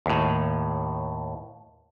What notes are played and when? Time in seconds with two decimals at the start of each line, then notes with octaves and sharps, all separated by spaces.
0.06 D#2 A2